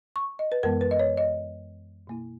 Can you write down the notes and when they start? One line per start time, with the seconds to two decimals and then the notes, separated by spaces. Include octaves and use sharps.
0.16 C#6
0.39 D#5
0.52 B4
0.63 F#2 E3 G#3 B3 A#4
0.81 B4
0.91 D#5
0.99 C#5
1.17 D#5
2.07 B2 A#3 E4